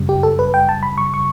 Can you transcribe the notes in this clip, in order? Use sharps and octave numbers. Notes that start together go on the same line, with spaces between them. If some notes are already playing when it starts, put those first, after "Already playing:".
Already playing: F#2 C#3 G3
G4
A4
B4
G5
A5
B5
C#6
C#6